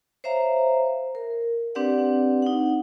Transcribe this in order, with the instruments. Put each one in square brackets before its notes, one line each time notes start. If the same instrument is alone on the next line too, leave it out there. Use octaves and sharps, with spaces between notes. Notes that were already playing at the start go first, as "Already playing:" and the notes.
[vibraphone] C5 C#5 E5 F5 A#5
A#4
C4 D4 G4 B4 D5 F#5
D#4 F#5